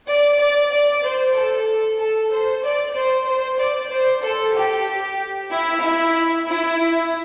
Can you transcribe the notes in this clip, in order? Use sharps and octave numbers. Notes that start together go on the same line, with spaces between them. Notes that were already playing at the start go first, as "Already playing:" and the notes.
D5
D5
D5
C5
A4
A4
C5
D5
C5
C5
D5
C5
A4
G4
E4
E4
E4